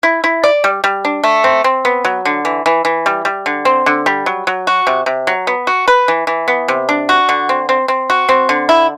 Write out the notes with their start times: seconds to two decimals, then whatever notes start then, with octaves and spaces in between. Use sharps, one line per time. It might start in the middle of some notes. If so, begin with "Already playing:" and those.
0.03 E4
0.24 E4
0.44 D5
0.64 G3
0.84 G3
1.05 D4
1.24 A3
1.44 C4
1.64 C4
1.85 B3
2.05 F#3
2.25 D3
2.45 E3
2.66 E3
2.85 E3
3.06 G3
3.25 G3
3.46 D3
3.65 C4
3.86 D3
4.06 G3
4.26 F#3
4.47 F#3
4.67 F#4
4.87 C3
5.06 C3
5.27 F#3
5.47 B3
5.67 F#4
5.88 B4
6.08 E3
6.27 E3
6.48 B3
6.68 C3
6.89 D4
7.09 F#4
7.29 D3
7.49 C4
7.69 C4
7.88 C4
8.10 F#4
8.29 C4
8.49 D3
8.69 E4